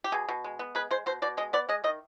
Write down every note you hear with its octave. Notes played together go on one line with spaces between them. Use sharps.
G4
B2 G#4
B2
G#3
B3
G#3 B4
G#3 C5
B2 C5
B2 D5
G#3 D#5
B3 D5
G#3 D#5
D#3 D#5